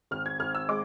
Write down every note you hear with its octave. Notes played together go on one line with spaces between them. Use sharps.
G#1 F6
G#6
G#1 F6
E6
G#3 D6